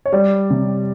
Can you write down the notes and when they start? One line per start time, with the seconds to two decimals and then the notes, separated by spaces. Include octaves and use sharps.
0.06 C#5
0.12 G3 D5
0.50 C3